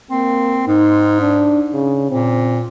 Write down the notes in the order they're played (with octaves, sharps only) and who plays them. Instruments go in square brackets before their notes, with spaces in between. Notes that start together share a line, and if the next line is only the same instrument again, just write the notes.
[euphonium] A#3 [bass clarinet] C4
[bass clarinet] G#2 [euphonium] D#4
[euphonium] D4
C#3
[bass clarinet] A#2 [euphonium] C4